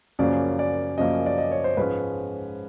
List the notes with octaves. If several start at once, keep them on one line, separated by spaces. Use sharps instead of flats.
F#2 C#3 F3 A#3 C#4 D5
D5
F#2 C#3 F3 A#3 C#4 D#5
D5
D#5
C#5
C5
G#2 F3 G#3 C#4 B4